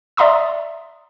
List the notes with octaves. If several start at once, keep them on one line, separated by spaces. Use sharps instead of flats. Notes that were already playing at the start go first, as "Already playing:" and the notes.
D5 E5 A#5 C6 D#6